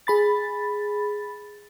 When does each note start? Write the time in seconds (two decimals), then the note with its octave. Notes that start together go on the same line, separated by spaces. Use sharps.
0.07 G#4 B5 A6